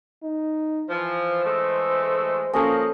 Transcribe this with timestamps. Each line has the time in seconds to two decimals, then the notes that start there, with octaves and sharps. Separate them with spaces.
0.23 D#4
0.90 E3 F3 C5
1.44 E3 G#3 A3
2.53 F3 A#3 C#4 A4 D#5